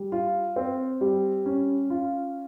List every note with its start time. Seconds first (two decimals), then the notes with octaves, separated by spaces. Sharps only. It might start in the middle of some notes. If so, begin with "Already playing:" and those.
Already playing: G3
0.12 F4
0.56 C4
1.01 G3
1.46 C#4
1.90 F4